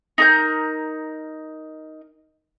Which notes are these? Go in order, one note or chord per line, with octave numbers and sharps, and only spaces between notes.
D#4 A#4 G6